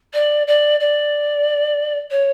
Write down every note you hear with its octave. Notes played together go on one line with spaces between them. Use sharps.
D5
D5
D5
C#5